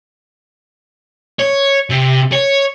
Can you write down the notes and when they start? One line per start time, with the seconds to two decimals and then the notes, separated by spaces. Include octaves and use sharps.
1.39 C#5
1.90 C3
2.32 C#5